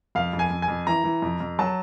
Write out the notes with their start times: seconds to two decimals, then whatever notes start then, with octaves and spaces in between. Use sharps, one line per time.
0.15 F2 F5
0.33 F2
0.39 G#5
0.51 F2
0.62 G#5
0.68 F2
0.87 E3 A#5
1.04 E3
1.22 F2
1.40 F2
1.59 F#3 A5